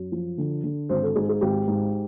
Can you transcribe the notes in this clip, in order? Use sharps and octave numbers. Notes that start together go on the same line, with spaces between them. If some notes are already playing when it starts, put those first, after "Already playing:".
Already playing: F#2
F3
D3
D3
G#1 C5
A4
G#2 G#4
G#4
G#1 G4
G#2